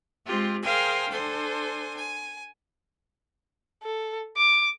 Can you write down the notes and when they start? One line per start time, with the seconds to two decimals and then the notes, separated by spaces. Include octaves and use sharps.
0.25 G#3 C4 F4 G4
0.62 G#4 A#4 C5 F5 G5 G#5
1.08 D4 A4 C5 G#5
1.97 G#5
3.83 A4
4.37 D6